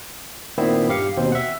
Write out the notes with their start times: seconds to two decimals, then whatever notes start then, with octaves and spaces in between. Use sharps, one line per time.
0.58 A#2 D#3 B3 C4 E4
0.88 G2 G4 F5 C#7
1.17 D#2 B2 C4 C5
1.32 E5 F#5